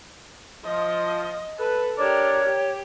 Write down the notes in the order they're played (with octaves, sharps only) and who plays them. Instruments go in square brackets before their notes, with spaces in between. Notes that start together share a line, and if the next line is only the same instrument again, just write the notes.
[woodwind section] F3 [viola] D#5
[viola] A4 [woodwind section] B4
[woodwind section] D4 D5 [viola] G4 A#4 [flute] C#5
[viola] G4